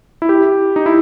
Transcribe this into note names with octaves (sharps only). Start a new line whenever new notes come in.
E4
G4
D#4
E4